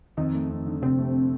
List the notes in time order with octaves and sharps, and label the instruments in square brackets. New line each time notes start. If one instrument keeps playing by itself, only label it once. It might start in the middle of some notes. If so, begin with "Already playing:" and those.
[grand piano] F2 [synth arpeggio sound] D#3 D#4
[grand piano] A3
F2
D3
[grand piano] F2 [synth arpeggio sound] C3 C4
[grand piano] A3